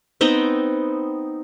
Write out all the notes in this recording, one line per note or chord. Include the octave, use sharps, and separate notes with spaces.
B3 C4 D#4